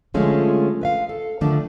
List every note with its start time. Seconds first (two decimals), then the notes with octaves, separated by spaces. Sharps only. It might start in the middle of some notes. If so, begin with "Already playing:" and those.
0.14 D3 F3 G#3 A3 C#4 F4
0.81 B4 E5 F5
1.09 A4
1.41 D3 D#3 F3 A3 D4